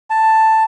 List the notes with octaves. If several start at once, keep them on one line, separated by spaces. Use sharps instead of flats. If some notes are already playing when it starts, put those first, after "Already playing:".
A5